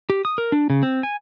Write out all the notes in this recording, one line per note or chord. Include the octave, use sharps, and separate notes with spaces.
G4
D#6
A#4
D4
C#3
C4
G#5